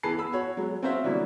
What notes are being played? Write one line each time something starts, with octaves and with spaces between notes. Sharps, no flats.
E3 B3 G#4 B4 A5 C7
B5 E6
F#4 C#5
F#3 G#3 B3
C4 C#4 F#4 C5 E5 F5
B2 D3 E3 F#3 G3 A#3